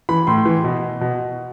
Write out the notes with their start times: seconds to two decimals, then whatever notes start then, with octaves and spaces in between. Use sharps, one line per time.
0.09 E3 B5
0.27 A2 C6
0.45 E3
0.64 B2
1.01 B2